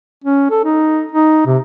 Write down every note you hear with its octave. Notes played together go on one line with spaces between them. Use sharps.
C#4
A4
D#4
D#4
C3